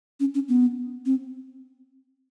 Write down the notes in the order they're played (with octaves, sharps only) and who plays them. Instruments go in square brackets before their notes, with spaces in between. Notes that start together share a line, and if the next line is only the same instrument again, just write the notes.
[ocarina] C#4
C#4
B3
C4